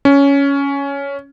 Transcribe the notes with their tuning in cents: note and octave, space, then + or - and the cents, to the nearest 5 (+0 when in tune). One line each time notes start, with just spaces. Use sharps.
C#4 +10